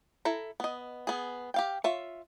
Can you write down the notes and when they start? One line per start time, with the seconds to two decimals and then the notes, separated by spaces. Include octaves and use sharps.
0.25 E4 A4 A#5
0.60 B3 D#5
1.07 B3 G#4
1.54 G4 F5 G5
1.84 F4 C#5 E5